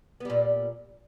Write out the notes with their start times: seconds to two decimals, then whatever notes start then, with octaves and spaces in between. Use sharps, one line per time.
0.20 B3
0.25 G3
0.30 A#2